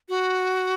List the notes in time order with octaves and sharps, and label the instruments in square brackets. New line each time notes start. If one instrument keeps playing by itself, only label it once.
[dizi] F#4